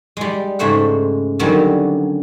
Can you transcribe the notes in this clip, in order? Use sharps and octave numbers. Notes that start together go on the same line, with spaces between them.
G3 G#3
G#2 C#3 G#3 A3 C5 F#5
D3 D#3 F#3 G3 C4 C#4